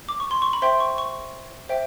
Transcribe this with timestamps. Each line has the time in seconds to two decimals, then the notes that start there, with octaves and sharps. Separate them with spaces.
0.09 D6
0.20 C#6
0.31 C6
0.42 C#6
0.53 B5
0.62 C5 E5 G5 C6
0.80 C#6
0.98 C#6
1.69 C5 E5 G5